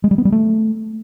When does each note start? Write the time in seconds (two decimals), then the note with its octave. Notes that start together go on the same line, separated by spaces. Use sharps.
0.04 G#3
0.11 G3
0.18 B3
0.25 G3
0.32 A3